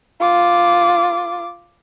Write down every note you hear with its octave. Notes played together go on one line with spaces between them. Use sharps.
F4 D6